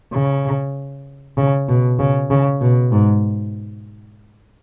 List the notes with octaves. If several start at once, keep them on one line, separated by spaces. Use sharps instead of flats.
C#3
C#3
B2
C#3
C#3
B2
G#2